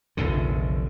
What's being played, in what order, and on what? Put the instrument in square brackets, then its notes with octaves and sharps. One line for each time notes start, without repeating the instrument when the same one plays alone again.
[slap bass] F1 A#1 E2 D3